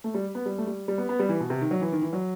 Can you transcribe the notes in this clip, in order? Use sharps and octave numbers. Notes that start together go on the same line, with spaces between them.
A3
G3
B3
G3
A3
G3
G3
B3
B3
G3
E3
B2
C3
D#3
F#3
E3
D#3
E3
F#3